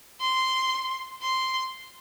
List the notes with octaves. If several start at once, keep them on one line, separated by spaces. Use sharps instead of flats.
C6
C6